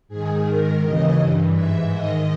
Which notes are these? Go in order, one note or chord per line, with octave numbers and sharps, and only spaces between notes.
G#2 D#3 G#4
G#2 D#3 A#4
D#2 C#3 E3 D#5
G2 E3
G#2 E3 E5
G#2 D#3 D#5